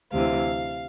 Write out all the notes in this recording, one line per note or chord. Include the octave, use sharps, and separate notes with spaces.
D2 C3 E3 F5